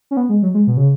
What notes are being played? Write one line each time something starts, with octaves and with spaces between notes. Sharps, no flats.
C#4
B3
G#3
F#3
G#3
B2
C#3